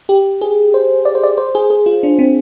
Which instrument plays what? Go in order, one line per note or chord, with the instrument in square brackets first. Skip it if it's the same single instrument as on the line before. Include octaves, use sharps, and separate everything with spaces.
[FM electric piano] G4
G#4
C5
D5
C5
D5
C5
G#4
G#4
F4
D4
C4